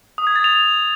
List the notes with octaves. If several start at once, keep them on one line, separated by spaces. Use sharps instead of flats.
D#6
G#6
A6
F7